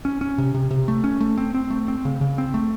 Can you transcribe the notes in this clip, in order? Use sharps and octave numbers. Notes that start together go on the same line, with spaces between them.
C#4
C#4
C3
C3
C3
A3
C#4
A3
C4
C4
A3
C4
C#3
C#3
C4
A3